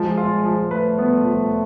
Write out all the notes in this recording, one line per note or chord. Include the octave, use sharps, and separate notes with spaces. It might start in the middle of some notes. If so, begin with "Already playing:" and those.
Already playing: F3 G#3
F4
F3
A3 B4
B3
F3